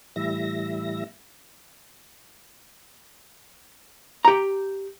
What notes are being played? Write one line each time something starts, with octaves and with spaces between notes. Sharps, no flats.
A2 E3 G3 E5 A#6
G4 A#5